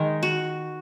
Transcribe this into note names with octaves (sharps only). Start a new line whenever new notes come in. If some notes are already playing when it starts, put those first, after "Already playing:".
Already playing: D#3 G#3 D#4 A#4
F#4